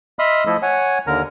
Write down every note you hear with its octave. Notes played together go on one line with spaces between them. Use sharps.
D#5 E5 B5 C6 D#6 F6
F3 A3 E4 A4 D#5
C#5 F#5 G#5
D#2 D3 A#4 A#5